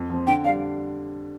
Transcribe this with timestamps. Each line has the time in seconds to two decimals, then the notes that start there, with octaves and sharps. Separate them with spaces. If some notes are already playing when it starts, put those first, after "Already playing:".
Already playing: F2
0.10 F3 C4
0.27 D3 G5
0.44 D4 F5
0.48 G3